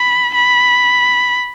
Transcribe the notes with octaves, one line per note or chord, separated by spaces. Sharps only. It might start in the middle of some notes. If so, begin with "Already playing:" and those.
Already playing: B5
B5